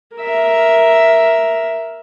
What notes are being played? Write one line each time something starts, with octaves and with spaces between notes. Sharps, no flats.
A#4 E5